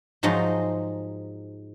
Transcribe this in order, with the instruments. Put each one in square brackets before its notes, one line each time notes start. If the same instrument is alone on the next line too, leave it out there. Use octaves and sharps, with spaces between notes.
[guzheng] G#2 F3 F#3 G#3 D#4